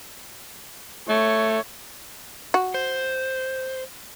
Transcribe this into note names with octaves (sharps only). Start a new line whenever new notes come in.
A3 C#5
F#4
C5